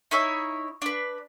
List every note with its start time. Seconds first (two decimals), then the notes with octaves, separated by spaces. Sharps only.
0.11 D#4 E4 C#5 E6
0.82 D4 B4